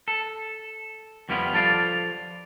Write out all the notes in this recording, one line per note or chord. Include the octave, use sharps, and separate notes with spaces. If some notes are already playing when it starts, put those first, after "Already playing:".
A4
F2 G3 B3 E4 F4
F3 A4 D5 F5